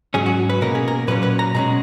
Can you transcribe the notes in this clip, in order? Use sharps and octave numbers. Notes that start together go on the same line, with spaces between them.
G#2 F#3 C#4 G#4
F#4
B4
B2 A#3 C#4 A#4
G#4
A#4
A#2 F#3 A#3 C#4 B4
B4
A#5
B2 G#3 C#4 A#5